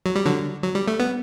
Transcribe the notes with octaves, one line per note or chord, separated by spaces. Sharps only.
F#3
G3
D3 F#3
F#3
G3
A3
B3